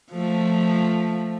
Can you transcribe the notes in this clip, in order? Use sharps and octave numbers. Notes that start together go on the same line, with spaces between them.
F3 A3